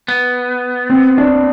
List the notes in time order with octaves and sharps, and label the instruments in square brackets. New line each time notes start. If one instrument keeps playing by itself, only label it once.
[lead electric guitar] B3
[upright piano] C4
D4